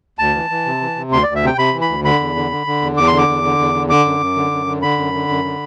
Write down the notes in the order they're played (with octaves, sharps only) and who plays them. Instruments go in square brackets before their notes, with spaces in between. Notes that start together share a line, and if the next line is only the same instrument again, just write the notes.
[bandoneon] D2 A5
E3
E3
C3
E3
C3
D2 C6
D2 D5
E5
C3 G5
C3 B5
E3
B5
D2
D3 B5
E2
D3
D3
D3
E2
E2 D6
D3 C6
D6
E2
D3
E2
D3
D3 D6
F#2
F#2
D3
F#2
D3
D3 B5
F#2
D3
F#2
D3